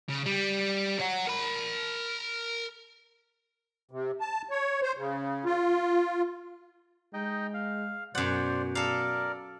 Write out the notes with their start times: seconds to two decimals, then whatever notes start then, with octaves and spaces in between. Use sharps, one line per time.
0.09 C#3
0.26 G3
1.00 C#5 F#5
1.27 A#4 B5
3.91 C3
4.21 A5
4.51 C#5
4.82 C5
4.97 C#3
5.45 F4
7.14 G#3 D#4 D#5 G5
7.54 F5
8.15 F#2 B2 C5 D5 F#5
8.75 A4 A#4 D5 F5